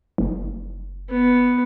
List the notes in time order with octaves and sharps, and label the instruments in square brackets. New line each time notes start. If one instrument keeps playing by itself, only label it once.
[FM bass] F#1
[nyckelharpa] B3